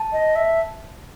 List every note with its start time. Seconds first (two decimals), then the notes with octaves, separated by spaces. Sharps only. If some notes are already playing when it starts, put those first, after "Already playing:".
Already playing: A5
0.13 D#5
0.36 E5